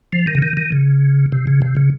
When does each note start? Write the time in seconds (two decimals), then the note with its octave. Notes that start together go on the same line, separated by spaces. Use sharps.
0.13 F3
0.27 D#3
0.35 C#3
0.42 D#3
0.57 D#3
0.72 C#3
1.32 C3
1.47 C#3
1.62 C3
1.77 C#3